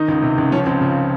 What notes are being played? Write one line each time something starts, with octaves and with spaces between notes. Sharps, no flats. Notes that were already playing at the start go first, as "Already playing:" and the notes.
Already playing: D#3 D#4
C#2
C3
C#2
F3 C#4
C#2 C4
C#3